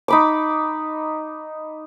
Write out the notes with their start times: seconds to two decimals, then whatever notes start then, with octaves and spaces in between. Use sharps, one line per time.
0.08 D#4 B5 D6